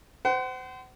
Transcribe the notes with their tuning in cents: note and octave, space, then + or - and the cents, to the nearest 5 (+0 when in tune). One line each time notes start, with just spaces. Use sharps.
C5 -25 F#5 +35